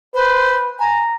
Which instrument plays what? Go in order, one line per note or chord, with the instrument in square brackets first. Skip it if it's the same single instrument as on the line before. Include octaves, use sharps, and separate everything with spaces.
[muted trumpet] B4 [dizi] C5
[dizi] G#5 [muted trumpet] A#5